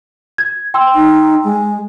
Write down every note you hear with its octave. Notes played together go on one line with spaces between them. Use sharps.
G#6
G5 C6 E6
D#4
G#3